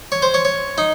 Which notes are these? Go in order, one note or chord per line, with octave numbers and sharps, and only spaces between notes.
C#5
C5
C#5
C#5
D#4